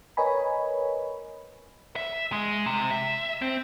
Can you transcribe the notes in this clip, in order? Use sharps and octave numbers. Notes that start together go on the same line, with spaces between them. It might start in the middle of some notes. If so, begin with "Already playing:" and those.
A#4 B4 C#5 D#5 G#5 B5
E5
G#3
C3
E5
C4